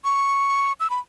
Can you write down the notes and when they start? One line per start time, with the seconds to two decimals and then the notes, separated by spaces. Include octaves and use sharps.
0.04 C#6
0.80 E6
0.90 B5